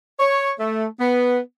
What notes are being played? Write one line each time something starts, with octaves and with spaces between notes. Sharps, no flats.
C#5
A3
B3